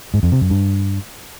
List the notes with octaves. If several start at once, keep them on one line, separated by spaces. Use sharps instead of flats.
G#2
F2
C3
F#2
G2